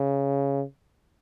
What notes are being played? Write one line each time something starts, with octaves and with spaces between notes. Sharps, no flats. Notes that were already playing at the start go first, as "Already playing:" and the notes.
Already playing: C#3